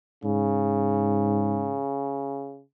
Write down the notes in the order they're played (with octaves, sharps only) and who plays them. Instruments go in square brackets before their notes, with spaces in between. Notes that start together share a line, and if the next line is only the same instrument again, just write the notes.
[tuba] G#2 [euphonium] C#3